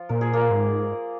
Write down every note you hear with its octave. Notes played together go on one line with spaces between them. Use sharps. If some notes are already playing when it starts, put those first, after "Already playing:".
Already playing: F3 F4
A#2 A#4
G#4
A#3 A#4
G#2